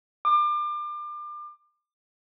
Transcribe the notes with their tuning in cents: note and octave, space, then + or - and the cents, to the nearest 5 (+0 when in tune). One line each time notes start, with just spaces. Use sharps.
D6 +30